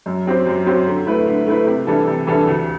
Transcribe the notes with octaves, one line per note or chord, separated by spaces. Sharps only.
F#2
F#3 C4 G4 C5
F#2
F#3 C4 G4 C5
D3
A3 E4 B4
D3
A3 E4 B4
C3
E3 G3 D4 A4
C3
E3 G3 D4 A4
D2